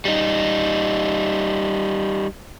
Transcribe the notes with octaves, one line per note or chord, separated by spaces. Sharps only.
G3 D#4